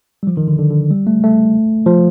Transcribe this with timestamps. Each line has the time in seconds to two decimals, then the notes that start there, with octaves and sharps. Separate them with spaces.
0.23 G3
0.27 F3
0.37 D#3
0.48 D3
0.59 D3
0.70 D3
0.91 G3
1.07 A3
1.23 A3
1.86 F3